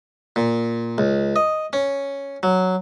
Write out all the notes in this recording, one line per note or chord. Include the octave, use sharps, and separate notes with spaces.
A#2
C#2
D#5
C#4
F#3